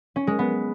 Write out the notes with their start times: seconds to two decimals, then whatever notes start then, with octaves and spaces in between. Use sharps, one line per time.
0.16 C#4
0.27 G#3
0.39 B3